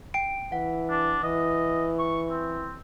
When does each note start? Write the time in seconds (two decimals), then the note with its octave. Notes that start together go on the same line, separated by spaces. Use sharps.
0.14 G5 D7
0.52 E3 F#5
0.89 D4
1.23 E3 D#5
1.99 C#6
2.30 C4